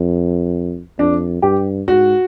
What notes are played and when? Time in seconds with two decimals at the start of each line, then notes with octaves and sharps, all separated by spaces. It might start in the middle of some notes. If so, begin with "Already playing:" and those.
Already playing: F2
0.99 F2 D4
1.42 G2 G4
1.88 G#2 F#4